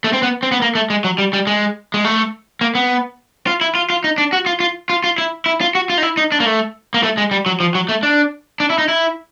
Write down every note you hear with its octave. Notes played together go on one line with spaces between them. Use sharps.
A3
C4
B3
C4
B3
A#3
A3
G#3
F#3
G3
G3
G#3
G#3
A3
A#3
B3
F4
E4
F4
F4
D#4
D4
F#4
F4
F4
F4
F4
E4
E4
F4
F#4
F4
D#4
E4
D#4
D4
A#3
A3
A#3
A3
G#3
G3
F#3
F3
F#3
A3
D4
D4
E4
D#4
E4